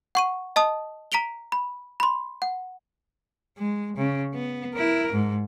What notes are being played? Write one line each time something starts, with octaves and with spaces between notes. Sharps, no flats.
F#5 C#6 D#7
D#5 A5 D#6
A#5 B6 D7 F7 G7
B5
B5 C6
F#5
G#3
C#3
B3
E4 A#4
G#2